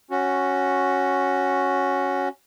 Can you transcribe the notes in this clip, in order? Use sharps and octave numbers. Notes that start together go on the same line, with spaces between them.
C#4 F#4